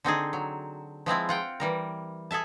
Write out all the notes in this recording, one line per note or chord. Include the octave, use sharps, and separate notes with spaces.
D3 C4 D#4 G#4
F#3
F3 G#3 C4 E4
F4 F#5 G5
E3 G3 A#4
G#4 A4 E5 A5